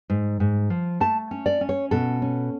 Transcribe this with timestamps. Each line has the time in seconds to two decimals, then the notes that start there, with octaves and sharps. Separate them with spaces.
0.10 G#2
0.40 G#2
0.70 F3
1.00 A3 A5
1.31 C#4
1.46 D5
1.61 C#4
1.69 C#5
1.91 B2 A4
2.22 C#4